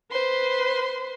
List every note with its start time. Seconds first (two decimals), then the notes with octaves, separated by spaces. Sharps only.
0.11 B4 C5 C6